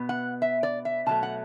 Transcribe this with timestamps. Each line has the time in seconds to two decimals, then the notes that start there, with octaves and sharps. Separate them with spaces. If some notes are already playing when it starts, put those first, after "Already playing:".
Already playing: B2 B3
0.09 F#5
0.42 E5
0.63 D5
0.85 E5
1.06 B2 F#3 A3 A5
1.23 F#5